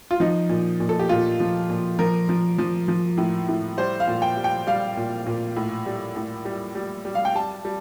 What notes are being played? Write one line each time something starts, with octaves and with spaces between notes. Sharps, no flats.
F4
F3 D#4
A#2
A#2
A4
G4
A#2 F4
F3
A#2
F3 A#4
F3
F3
F3
A2
A2
G3 C5
F5
A#2
G5
G3
G5
G3 F5
A#2
A#2
A2
G3
A2
G3
G3
G3
F5
G5
G3 A5
G3